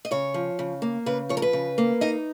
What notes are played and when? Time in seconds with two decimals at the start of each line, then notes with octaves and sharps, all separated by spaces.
0.05 D#5
0.11 C#3 C#5
0.34 F3
0.59 C#3
0.82 A#3
1.06 C#3 B4
1.29 F3 C#5
1.37 A#4
1.42 B4
1.53 C#3
1.78 A#3
2.01 D#4 D#5